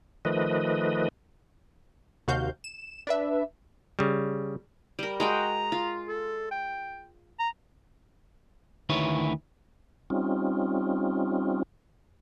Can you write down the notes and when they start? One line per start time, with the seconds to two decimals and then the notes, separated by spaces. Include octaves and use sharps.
0.25 D#3 F3 A3 B4 D#5
2.28 D#2 C3 F#4 F5 G6
2.64 E7
3.07 D4 B4 E5
3.99 C#3 G3
4.99 G3 A#4
5.20 G#3 F#4 G5 A#5
5.72 F4
6.08 A4
6.51 G5
7.40 A#5
8.89 D2 D#3 E4 B4 C#5
10.10 G3 C4 C#4 D#4 F4